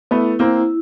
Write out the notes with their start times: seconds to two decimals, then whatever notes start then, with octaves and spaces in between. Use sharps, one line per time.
0.11 A3 B3 E4
0.39 A#3 C4 E4